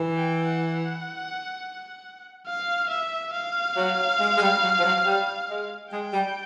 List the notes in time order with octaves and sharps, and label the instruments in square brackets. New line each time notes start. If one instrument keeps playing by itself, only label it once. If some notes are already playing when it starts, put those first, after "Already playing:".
Already playing: [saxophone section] E3
[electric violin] G5
F#5
F5
E5
F5
[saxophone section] F#3
G#3
G#3
G3
F#3
F3
F#3
G3
G#3
[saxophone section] G#3 [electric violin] G5
[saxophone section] G3